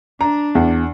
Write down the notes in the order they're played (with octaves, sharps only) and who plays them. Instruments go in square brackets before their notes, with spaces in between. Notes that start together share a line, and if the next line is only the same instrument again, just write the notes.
[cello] D4 [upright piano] A#5
[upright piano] E2